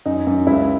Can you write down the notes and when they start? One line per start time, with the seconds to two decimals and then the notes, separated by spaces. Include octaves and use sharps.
0.06 F#2 D#4
0.27 F#2
0.47 C#2 E4